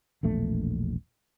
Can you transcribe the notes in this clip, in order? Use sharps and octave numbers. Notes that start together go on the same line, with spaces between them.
E1 A#1 A3